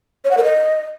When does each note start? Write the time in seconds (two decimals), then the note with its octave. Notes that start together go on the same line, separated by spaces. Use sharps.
0.25 C#5
0.31 F#5
0.37 A#4
0.44 D#5